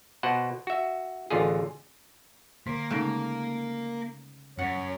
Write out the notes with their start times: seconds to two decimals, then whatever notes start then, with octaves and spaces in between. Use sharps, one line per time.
0.23 B2 C5 F#5
0.67 F#4 E5
1.30 A1 D3 F4 G#4
2.67 D3 A#3
2.91 C#3 G#3 A3 D#4
4.59 F#2 C#5 F#5